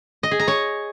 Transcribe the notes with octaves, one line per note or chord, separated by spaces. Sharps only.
D#5
G#4
A#5
C#5